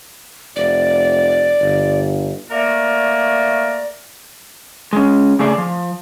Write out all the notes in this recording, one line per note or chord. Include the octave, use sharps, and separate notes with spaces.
F1 D5
G1
A3 A#3 F#4 A#4 D5
G#3 C#4
C#3 A3 G#4 D5
F3